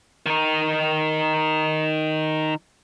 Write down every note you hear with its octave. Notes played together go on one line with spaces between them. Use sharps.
D#3 D#4